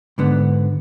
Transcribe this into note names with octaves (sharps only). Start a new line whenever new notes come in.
G#2 D3 B3